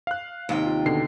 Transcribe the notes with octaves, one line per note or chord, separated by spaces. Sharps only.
F5 F#6
D#2 C3 G5
F4
B2 D3 C7